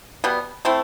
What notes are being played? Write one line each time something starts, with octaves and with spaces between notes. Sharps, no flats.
B2 G3 B3
A3 C4 E4